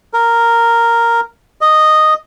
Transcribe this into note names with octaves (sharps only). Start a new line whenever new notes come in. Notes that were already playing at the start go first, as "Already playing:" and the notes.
A#4
D#5